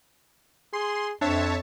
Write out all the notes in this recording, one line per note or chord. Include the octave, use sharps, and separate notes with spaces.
G#4 C6
F2 C4 D4 C#5 E5 A5